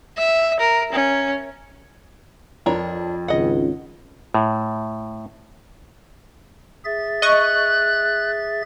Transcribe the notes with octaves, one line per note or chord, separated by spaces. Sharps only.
E5
A#4
C#4
F2 D4 A#4 C#5
G#1 C#2 D#5 F#5
A2
G#4 E5 A6
D#5 C#6 F#6